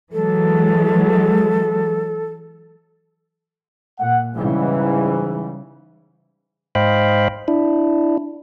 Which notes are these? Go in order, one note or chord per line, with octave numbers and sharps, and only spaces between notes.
E3 F#3 G#3 A4
A#2 F#5
G#2 C#3 E3 G3
G#2 C5 D#5 F5 G5 B5
D4 E4